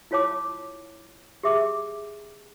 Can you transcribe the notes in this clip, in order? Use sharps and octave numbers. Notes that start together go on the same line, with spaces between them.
E4 F4 C#5 A5 D6
G4 G#4 E5 D6 E6